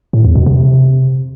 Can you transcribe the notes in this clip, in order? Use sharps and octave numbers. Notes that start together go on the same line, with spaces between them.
A2
E2
B2
C3